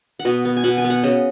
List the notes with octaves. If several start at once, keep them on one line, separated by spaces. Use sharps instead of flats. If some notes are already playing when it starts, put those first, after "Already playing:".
F#5
B2 D#5
B3
G#5
B2 F#5
G#5
B3
F#5
C#3 D#5